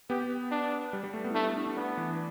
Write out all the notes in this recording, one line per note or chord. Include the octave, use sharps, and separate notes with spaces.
B3 G4
D4
G3
G3
A3
B3
E4
A3 D4
E4
D4
D4
B3 D4
E3